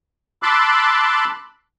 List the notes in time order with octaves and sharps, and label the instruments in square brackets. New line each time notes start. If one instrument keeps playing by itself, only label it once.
[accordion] A5 B5 C6 D6 E6 F#6